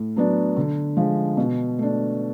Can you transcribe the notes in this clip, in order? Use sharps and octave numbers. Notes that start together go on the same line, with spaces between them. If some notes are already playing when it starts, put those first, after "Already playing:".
Already playing: A2
F#3 B3 D4
D3
F3 G#3
B2
A3 D4